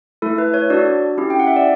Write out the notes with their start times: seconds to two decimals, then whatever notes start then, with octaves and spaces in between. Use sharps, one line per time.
0.22 A3 E4 A4
0.38 B4
0.54 C#5
0.70 D4 F#4 A4 D5
1.18 C#4 E4 G4
1.30 G5
1.40 F#5
1.47 E5
1.56 D5